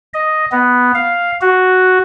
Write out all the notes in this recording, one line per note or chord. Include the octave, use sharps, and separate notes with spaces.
D#5
B3
F5
F#4